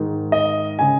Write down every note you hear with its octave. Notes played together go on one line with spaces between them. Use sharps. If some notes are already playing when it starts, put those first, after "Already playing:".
Already playing: G#2 D#3
D#5
C#3 G#5